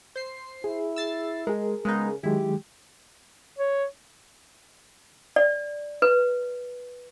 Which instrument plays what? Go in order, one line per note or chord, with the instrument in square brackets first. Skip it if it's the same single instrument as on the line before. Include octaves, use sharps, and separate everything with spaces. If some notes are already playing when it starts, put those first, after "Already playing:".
[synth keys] C5 C7
[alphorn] E4 [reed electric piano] G#4
[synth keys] E6 A6 C7
[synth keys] G#3 [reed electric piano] G#4 A#4
[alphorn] C#3 [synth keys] G#3 B3 D#4
[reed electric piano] D#3 F#3 G#3 [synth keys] E4 [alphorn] G4
[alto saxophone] C#5
[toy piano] D5
B4